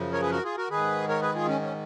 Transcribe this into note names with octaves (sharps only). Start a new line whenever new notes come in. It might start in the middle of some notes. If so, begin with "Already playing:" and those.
Already playing: F#2 C#3 F3
A#4 C#5
G#4 B4
F#4 A#4
F4 G#4
F#4 A#4
G#2 D#3 G#4 B4
A#4 C#5
G#4 B4
F4 G#4
C#4
C#4